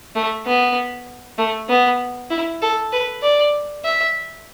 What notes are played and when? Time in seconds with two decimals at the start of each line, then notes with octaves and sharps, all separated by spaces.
0.15 A3
0.47 B3
1.38 A3
1.69 B3
2.31 E4
2.62 A4
2.92 B4
3.23 D5
3.84 E5